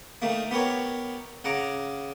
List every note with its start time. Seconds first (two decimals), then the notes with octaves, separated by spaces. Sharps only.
0.22 D#3 A3 A#3
0.51 B3 G4 A#4 C#5
1.45 C#3 F#5 A#5 D6